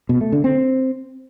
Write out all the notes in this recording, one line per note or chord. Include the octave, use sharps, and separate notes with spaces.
B2
A3
D3
C4